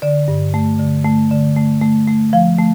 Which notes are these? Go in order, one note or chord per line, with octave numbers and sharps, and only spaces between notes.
D3 D5
G2
A3
D3
A3
D3
A3
A3
A3
F3 F5
A3